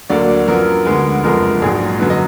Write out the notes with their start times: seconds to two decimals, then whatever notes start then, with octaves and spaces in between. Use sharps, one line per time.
0.10 D2 D3 F#3 A#3 D5
0.47 F#2 F3 B3 A#4
0.85 D2 D3 G#3 B3
1.23 F#1 F2 F3 G#3 B3 A#4
1.62 A#1 G#2 F#3 G#4
1.99 F#2 D3 F#3 B4
2.10 D#5